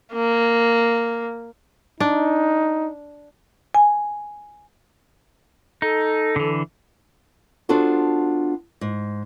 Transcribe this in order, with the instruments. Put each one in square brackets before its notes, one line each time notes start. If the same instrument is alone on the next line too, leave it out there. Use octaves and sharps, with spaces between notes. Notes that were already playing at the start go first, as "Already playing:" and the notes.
[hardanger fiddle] A#3
[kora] D4 [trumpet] D#4
[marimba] G#5
[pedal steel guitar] D#4 [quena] A4
[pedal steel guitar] D3 E3
[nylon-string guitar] B3 D4 F4 F#4 A4 C5
G#2